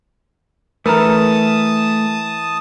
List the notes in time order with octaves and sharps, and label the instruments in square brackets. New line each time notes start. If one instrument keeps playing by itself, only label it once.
[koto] E3 A4 [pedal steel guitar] A3 F6 [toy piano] A#4 A#5 [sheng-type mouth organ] A5 D#6